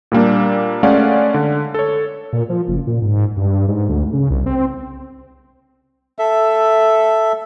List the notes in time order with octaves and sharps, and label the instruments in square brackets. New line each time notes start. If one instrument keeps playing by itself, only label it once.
[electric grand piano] A#2 G3 A#3 D4
G#3 A3 C#4 D5 F5 F#5
D3
A4 C#5
[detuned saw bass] A#2
F3
F#1
A#2
G#2
G2
G#2
D2
C#3
C2
C4
[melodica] A4 E5